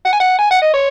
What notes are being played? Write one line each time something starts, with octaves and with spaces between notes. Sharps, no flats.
F#5
G#5
F#5
G#5
F#5
D#5
C#5